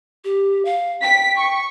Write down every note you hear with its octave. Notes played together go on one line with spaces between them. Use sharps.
G4
F5
G5 B6
C#6